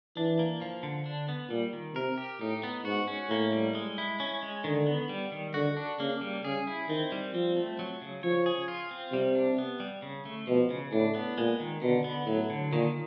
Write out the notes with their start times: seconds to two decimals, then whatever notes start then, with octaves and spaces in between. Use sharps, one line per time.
0.17 E3 D4
0.39 A#3
0.62 F3
0.83 D3
1.06 D4
1.29 B3
1.50 A#2 G3
1.73 D#3
1.95 C3 A#4
2.18 G4
2.41 A2 D#4
2.63 B3
2.85 G#2 F#4
3.08 C#4
3.30 A2 A#3
3.52 G3
3.75 G#3
3.98 E4
4.20 C#4
4.43 G#3
4.64 D3 D#3
4.87 B3
5.09 G3
5.32 D#3
5.54 D3 F#4
5.77 D4
6.00 C#3 A#3
6.21 G3
6.44 C#3 G#4
6.67 E4
6.89 D#3 C4
7.12 G3
7.34 F3 C4
7.56 A3
7.79 F#3
8.02 C#3
8.23 F3 C#5
8.46 G#4
8.68 F4
8.91 C4
9.13 C3 G3
9.35 D4
9.58 B3
9.80 G3
10.02 C#3
10.25 A3
10.47 B2 F3
10.70 C#3
10.92 A2 D4
11.15 B3
11.38 A#2 G#3
11.60 D#3
11.82 B2 D3
12.04 B3
12.27 A2 F#3
12.50 D3
12.72 A#2 D#3